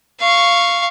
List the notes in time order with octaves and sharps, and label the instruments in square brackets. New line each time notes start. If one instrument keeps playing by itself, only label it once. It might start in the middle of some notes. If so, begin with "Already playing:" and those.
[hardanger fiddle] F5 C#6